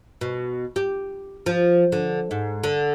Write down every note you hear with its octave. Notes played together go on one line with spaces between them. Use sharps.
B2
G4
F3
D3
G#2
D3